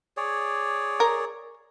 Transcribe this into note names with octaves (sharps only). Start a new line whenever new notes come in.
G#4 C#5 D5
A#4